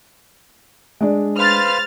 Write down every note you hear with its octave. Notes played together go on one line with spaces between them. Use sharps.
G#3 D4
B4 C5 F5 F6 A6